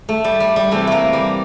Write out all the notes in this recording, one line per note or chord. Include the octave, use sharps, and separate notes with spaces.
A3
G3
G3
G3
C3 E3 A3
A3 A#3
G3